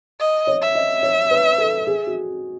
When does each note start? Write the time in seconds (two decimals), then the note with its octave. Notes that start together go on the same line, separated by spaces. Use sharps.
0.20 D#5
0.47 C#5
0.62 E5
0.75 D#5
1.03 C#5
1.31 B4
1.58 A4
1.87 G#4
2.07 F#4